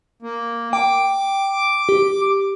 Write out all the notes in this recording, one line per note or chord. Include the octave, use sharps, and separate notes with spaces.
A#3
G5 D6
G4